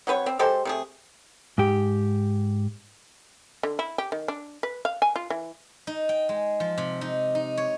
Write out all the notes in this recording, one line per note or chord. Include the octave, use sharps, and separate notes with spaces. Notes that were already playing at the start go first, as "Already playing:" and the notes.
F#3 C4 B4 C#5
C4
G#3 G4 A4 C5
C3 A3 G#4
G#2 G4
D3
E4
G4
D#3
D4
B4
F5
G#5
F4
E3
D#4
G5
G#3
F3
C3
D#4
D#4
C#5